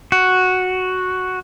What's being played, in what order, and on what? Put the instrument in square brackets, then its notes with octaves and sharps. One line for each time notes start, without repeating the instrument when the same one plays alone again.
[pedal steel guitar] F#4